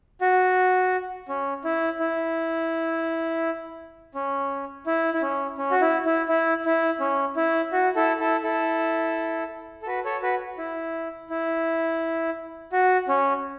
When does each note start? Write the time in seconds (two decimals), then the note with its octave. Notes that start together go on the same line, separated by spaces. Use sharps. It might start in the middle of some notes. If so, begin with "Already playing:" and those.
0.21 F#4
1.29 C#4
1.64 E4
2.00 E4
4.15 C#4
4.86 E4
5.14 E4
5.22 C#4
5.58 C#4
5.71 F#4
5.81 E4
6.06 E4
6.29 E4
6.65 E4
7.00 C#4
7.36 E4
7.72 F#4
7.95 E4 A4
8.20 E4 A4
8.43 E4 A4
9.82 A4
9.87 F#4 B4
10.04 A4 C#5
10.22 F#4 B4
10.58 E4
11.30 E4
12.72 F#4
13.08 C#4